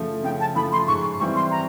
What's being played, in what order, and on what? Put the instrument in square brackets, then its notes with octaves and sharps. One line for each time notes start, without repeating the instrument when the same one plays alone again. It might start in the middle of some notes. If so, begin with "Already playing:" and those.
Already playing: [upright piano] C#3 F3 A3
[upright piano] C#3 [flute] G5
[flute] A5
[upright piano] F3 A3 [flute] B5
[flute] C6
[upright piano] G#2 [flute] C#6
[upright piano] E3 G3 C4 E4 [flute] C#6
[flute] C6
A#5